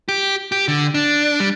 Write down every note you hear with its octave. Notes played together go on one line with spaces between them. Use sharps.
G4
G4
D3
D4
G3